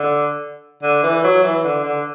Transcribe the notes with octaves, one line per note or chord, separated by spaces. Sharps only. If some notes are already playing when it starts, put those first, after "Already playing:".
Already playing: D3
D3
E3
F#3
E3
D3
D3